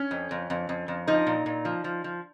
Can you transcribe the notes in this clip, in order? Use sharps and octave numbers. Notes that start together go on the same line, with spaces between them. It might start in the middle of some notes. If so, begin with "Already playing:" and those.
Already playing: C#4
F2
F2
F2
F2
F2
F3 D#4
A#2
A#2
F3
F3
F3